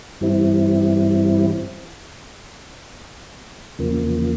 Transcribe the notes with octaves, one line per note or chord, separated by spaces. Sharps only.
G2 E3 G3 C4 E4
E2 C#3 F3 A#3